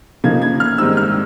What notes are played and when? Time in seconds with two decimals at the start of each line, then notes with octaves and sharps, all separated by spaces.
0.24 C#3 F3 A#3 D#4 G#6
0.42 G#6
0.60 F6
0.78 G#2 D#3 G3 C4 D#4 E6
0.97 F6